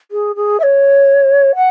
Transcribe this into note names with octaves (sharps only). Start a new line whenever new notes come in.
G#4
G#4
E5
C#5
F#5